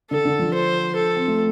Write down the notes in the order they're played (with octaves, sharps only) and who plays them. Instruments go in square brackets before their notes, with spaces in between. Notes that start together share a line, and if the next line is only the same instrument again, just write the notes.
[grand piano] D3 [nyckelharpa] A4
[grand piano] D3
F3
[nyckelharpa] C5
A4
[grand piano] C4
A3